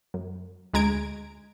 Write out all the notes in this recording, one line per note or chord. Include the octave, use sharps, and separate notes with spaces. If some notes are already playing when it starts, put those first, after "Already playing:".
F#2
D2 G#3 A#5 G#6 D7